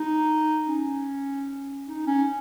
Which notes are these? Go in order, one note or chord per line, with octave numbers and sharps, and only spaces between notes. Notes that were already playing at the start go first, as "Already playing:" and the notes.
Already playing: D#4
C#4
D#4
C#4